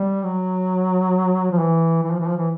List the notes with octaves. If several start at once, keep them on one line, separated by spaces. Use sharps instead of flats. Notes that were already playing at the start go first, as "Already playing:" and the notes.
Already playing: G3
F#3
F3
E3
E3
F3
E3
F3
E3